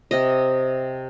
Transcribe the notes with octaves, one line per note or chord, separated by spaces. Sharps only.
C3 D#5